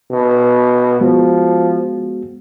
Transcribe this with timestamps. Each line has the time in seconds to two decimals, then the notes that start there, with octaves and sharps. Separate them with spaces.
0.11 B2
1.01 F3 G#3 B3 F#4